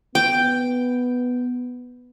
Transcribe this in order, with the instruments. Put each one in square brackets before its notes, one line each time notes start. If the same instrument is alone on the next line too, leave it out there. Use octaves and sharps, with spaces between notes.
[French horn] B3 [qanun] G5